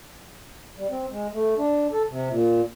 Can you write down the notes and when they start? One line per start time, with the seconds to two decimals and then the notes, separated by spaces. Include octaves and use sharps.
0.78 G3
0.90 C4
1.11 G#3
1.33 A3
1.58 D4
1.92 A4
2.09 C3
2.29 A#2